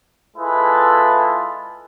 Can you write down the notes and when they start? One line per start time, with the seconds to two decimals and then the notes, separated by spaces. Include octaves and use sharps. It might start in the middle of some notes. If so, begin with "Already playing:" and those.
0.37 G#3 E4 F4 A4 B4